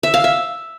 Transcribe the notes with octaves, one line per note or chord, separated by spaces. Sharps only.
E5
F5
E5